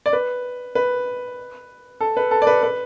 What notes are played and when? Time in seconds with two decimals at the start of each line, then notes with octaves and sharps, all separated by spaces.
0.06 D5
0.13 B4
0.75 B4
2.00 A4
2.17 B4
2.31 A4
2.42 D5
2.47 B4
2.63 B4